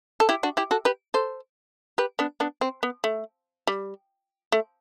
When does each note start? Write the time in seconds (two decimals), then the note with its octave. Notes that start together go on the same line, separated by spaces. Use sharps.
0.20 A4
0.29 E4 G4
0.43 D4 F#4
0.57 E4 G4
0.71 F#4 A4
0.85 G4 B4
1.14 A4 C5
1.98 G4 B4
2.19 B3 D4
2.40 B3 D4
2.61 C4
2.83 B3
3.04 A3
3.67 G3
4.52 A3